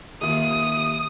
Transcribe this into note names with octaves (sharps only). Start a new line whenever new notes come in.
D#2 C3 F4 D#6